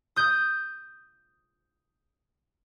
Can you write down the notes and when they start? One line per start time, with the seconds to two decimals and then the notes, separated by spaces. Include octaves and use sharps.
0.16 D#6 G6